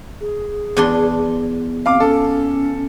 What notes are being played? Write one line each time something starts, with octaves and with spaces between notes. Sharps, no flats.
G#4
E2 D4 C6
C4 F5 D6
C#4 A4